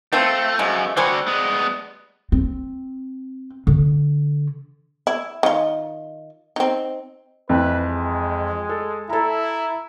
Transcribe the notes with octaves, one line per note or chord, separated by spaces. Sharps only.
F3 A3 C4
F#2 F3 G#3 A3
D3 G3 F#4 C5 G#5
G#3 B3
C4
D3
E4
D#3 F4
C4 D#4
F2 E3 B4
G#3
A4
E4 A4 A#5